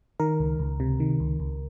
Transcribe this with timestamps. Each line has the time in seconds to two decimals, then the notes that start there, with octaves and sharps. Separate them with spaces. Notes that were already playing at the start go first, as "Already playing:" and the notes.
0.20 D#3 A#4
0.40 C#2
0.59 C#2
0.80 C3
1.00 D#3
1.20 C#2
1.40 C#2